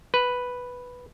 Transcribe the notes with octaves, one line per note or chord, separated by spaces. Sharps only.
B4